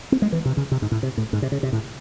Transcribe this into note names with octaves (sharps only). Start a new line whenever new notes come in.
C4
G#3
E3
C3
C#3
C3
G#2
A2
C3
A2
G#2
C3
C#3
C3
A2